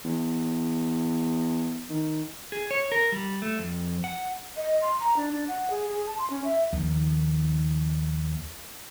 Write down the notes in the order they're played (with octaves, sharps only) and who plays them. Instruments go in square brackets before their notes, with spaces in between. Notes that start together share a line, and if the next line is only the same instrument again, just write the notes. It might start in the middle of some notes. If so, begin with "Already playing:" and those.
[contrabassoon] E2
D#3
[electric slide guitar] G#4
C#5
A#4
G3
A3
F2
F#5
[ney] D#5
C6
A#5
D4
D4
F#5
G#4
G#4
A5
C6
C#4
E5
[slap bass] D#2 D#3 F3